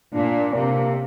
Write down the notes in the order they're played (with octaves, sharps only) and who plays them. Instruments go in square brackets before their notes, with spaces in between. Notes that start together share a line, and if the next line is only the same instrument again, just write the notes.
[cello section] A#2 [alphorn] D4
[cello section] C3 [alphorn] A#3